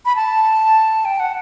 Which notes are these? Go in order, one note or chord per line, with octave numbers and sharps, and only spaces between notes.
B5
A5
G5
F#5